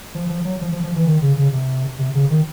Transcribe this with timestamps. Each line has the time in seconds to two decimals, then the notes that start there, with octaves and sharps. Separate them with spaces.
0.15 F3
0.29 F3
0.45 F#3
0.61 F3
0.72 F3
0.84 F3
0.96 E3
1.07 D#3
1.22 C#3
1.37 C#3
1.52 C3
1.99 C3
2.15 C#3
2.30 D#3